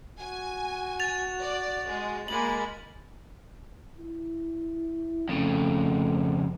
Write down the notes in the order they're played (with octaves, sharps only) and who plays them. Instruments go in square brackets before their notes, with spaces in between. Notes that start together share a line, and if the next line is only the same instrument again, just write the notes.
[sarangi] F#4 [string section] G#5
[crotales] A6 F7
[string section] D5
G#3
[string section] G#3 A#3 [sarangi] B5 [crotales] F#7
[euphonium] E4
[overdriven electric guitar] F2 C#3 [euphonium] A3